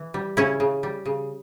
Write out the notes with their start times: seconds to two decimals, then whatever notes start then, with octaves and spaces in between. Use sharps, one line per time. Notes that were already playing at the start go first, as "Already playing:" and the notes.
Already playing: E3
0.14 G3
0.37 C#3 C#4 E4
0.60 C#3
0.83 G3
1.05 C#3